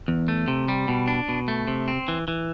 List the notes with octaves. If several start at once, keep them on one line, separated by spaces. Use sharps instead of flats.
E2
A3
C3
G3
B2
D4
B2
A3
C3
C4
E3
E3